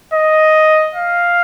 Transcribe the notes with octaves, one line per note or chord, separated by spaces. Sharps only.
D#5
F5